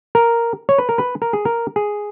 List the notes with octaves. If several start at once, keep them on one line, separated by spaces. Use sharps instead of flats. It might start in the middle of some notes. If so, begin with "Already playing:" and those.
A#4
C#5
B4
A#4
B4
A#4
G#4
A#4
G#4